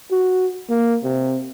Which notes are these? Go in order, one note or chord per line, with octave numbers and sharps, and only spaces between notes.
F#4
A#3
C3